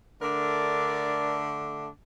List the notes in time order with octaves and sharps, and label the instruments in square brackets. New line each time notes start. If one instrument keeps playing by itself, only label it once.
[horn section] D3 A3 D4 A#4 D5